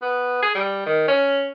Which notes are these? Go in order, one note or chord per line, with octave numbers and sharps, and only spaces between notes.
B3
G#4
G3
D#3
C#4